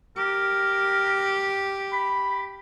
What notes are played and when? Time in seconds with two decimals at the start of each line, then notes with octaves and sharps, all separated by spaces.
0.17 G4 A#4
1.92 B5